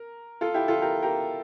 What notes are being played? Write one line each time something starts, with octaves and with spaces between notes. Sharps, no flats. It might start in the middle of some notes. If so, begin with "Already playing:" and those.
Already playing: A#4
F4 A4
E4 G4
F4 A4
G4 A#4
G4 A#4